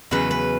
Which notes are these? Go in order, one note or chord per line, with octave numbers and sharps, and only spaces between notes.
E2 C#3 F#3 B4
B4